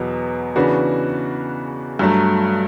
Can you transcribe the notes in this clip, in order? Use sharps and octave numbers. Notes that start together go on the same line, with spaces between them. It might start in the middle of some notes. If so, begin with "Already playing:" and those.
Already playing: E2 B2 F#3 B3
C#3 E3 B3 D4 F#4
G2 F#3 A3